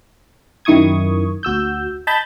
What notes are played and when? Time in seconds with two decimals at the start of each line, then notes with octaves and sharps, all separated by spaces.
0.65 F#2 D#3 E4 C#6 D#6 G#6
1.43 D2 F#4 E6 G6
2.07 D#5 A5 B5 G6 A6